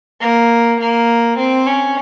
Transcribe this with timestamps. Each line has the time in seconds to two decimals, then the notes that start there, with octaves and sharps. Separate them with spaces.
0.21 A#3
0.80 A#3
1.38 C4
1.67 C#4